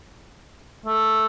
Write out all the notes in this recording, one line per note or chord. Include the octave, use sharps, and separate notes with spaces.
A3